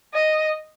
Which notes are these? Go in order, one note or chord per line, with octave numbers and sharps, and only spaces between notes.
D#5